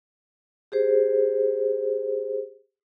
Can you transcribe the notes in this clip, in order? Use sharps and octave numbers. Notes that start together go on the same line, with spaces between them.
G4 G#4 C5